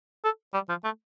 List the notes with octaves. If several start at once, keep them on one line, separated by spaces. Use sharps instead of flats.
A4
G3
F3
A3